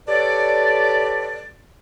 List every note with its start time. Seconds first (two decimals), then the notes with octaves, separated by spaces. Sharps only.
0.08 G4 A4 B4 C#5 D5